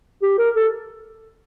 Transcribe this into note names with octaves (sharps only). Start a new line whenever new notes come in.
G4
A#4
A4